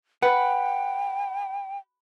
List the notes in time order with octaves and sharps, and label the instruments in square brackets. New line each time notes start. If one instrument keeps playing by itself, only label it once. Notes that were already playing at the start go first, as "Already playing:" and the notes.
[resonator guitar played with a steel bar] B4 [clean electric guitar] F#5 [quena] G5